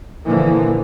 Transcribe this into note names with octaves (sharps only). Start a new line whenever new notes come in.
A#2 D3 E3 F3 A#3